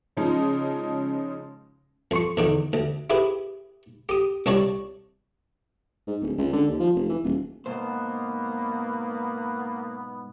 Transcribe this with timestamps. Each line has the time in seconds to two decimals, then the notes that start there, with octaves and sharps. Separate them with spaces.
0.17 C#3 F3 G#3 C#4 D#4
2.11 F2 C6 C#6
2.37 E2 D3 D#3
2.73 D2
3.10 E4 G4 G#4 B4
4.09 G4 D#6
4.46 C2 D4 G4 C#5 D5
6.07 G#2
6.22 D1
6.38 C#2
6.53 D3
6.68 D#2
6.80 F3
6.95 F1
7.09 E3
7.24 D#1
7.66 G#2 B2 A#3 B3 C5